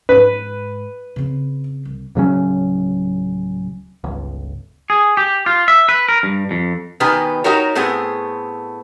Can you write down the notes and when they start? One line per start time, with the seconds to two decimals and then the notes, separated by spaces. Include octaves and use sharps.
0.09 G#2 B4
1.16 C#3 C4
1.85 C2
2.15 D1 C#3 F#3 C#4
4.04 G1 C#2
4.90 G#4
5.17 G4
5.46 F4
5.68 E5
5.89 B4
6.09 A#4
6.23 G2
6.51 F2
7.00 B2 D#3 B3 G4 B4 G#5
7.44 D#4 F#4 G4 A#4 C#5
7.75 A2 A3 B3 C4 G#4